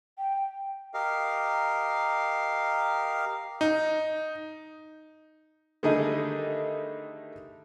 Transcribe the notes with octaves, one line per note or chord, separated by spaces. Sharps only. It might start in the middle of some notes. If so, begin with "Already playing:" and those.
G5
G4 A#4 D#5 F5
D#4
D3 D#3 G3 A3 D#4 G#4